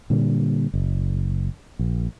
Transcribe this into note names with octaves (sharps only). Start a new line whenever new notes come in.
A#2 D3 G3
F#1
A#1